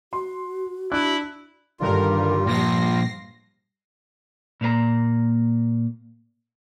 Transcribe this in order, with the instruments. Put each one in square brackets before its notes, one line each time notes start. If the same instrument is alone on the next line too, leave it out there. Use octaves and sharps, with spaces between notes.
[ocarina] F#4 [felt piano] C6
[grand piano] D4 [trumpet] E4 [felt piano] F#6 D7
[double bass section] G2 G3 [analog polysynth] D3 D#3 A#4 [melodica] F4
[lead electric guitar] A#2 F3 [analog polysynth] A#6 C7
[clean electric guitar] A#2 A#3 B4 A#5